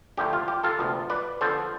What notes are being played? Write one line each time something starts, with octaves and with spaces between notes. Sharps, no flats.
D3 F3 A3 E4 G4
F4
G4
F4 A4
D2 C3 F3 B3
B4 D5
D3 F3 B3 A4 C5